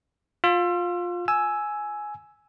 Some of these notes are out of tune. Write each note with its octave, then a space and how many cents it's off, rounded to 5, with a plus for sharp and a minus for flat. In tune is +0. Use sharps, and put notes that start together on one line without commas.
F4 +15 E6 +40
G#5 +10 E6 +0